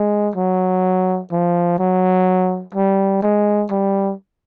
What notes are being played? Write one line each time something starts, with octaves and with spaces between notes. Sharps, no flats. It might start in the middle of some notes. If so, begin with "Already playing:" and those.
Already playing: G#3
F#3
F3
F#3
G3
G#3
G3